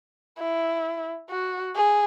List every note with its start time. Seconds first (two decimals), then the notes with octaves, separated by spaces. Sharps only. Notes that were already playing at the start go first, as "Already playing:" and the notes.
0.39 E4
1.30 F#4
1.76 G#4